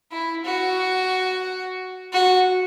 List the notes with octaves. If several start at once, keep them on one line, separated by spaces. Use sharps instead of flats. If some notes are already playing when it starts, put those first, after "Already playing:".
E4
F#4
F#4